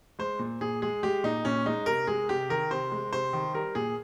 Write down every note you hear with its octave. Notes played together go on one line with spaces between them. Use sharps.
G#3 C5
A#2
A#2 G#4
G#3 G#4
G#3 G4
A#2 D#4
A#2 C#4
G#3 D#4
C3 A#4
G#3 G#4
C3 G4
D#3 A#4
C3 C5
G#3
C3 C5
D#3
G3 A#4
A#2 G#4